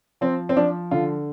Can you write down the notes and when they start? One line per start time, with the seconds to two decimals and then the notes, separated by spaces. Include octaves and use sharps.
0.21 F3 C4
0.49 C4
0.56 F3 D4
0.91 D3 F4